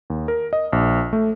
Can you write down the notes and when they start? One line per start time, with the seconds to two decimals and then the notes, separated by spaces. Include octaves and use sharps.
0.10 D#2
0.28 A#4
0.53 D#5
0.73 A#1
1.13 A3